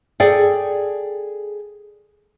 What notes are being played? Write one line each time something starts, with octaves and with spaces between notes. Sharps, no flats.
G#4 A4 D5 G5